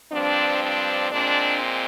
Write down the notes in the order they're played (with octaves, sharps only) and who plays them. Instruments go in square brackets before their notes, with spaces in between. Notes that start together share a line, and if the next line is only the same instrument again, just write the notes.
[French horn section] G2 F3 C4 D4
D4
A#2 G#3 C4 D4